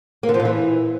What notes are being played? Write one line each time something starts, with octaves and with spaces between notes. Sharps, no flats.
A#3
D3
F3
A#2
E3